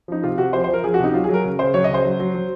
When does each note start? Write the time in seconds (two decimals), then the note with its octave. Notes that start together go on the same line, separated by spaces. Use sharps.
0.08 F3 D#4
0.23 C3 F4
0.38 C3 F#4
0.53 F3 C5
0.64 C5
0.69 F3 A#4
0.84 F3 G#4
0.94 F#4
0.99 C3
1.04 D#4
1.14 F#3 F4
1.24 G#4
1.29 F#3
1.34 A#4
1.44 C#3
1.59 C#3 C5
1.74 F#3 C#5
1.84 D#5
1.89 C#3 C5
2.05 F#3
2.20 F#3
2.35 F#3